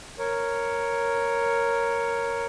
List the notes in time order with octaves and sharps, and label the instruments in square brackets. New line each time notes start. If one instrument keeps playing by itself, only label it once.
[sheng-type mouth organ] A#4 C#5